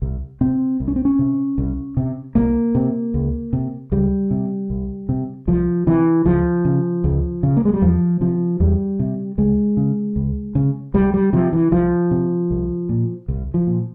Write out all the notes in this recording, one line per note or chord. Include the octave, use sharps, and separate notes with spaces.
C2
C3 C4
C2
C#4
C4
C#4
C3
C2
C3
C2 A#3
C3
C#2
C3
C#2 G3
C3
C2
C3
C2 F3
C3 E3
C#2 F3
C#3
C#2
C#3
A#3
G#3
G3
E2 F3
C3 F3
E2 G3
C3
C#2 G#3
C#3
C#2
C#3
C2 G3
G3
C3 F3
E3
C2 F3
C3
C2
A#2
C2
F3
A#2